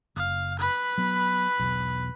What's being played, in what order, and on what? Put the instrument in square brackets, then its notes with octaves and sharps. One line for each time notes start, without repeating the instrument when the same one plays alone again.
[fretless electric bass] F#1 [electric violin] F5
[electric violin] B4 B5
[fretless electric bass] F#3 B3
E1 B1